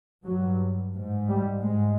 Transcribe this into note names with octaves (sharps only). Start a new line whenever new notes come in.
G2 F#3
G#2
G3
G#2 G#3